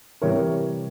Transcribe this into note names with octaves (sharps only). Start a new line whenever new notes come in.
C3 E3 G3 A#4 C#5